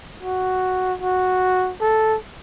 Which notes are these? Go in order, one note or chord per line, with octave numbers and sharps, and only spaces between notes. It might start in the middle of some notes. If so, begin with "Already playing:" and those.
F#4
F#4
A4